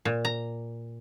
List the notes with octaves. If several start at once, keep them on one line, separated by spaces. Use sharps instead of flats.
A#2
A#5